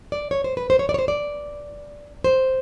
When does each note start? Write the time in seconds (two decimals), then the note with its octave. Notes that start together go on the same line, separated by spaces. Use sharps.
0.12 D5
0.31 C#5
0.44 C5
0.57 B4
0.70 C5
0.79 C#5
0.89 D5
0.94 C#5
0.99 C5
1.08 D5
2.24 C5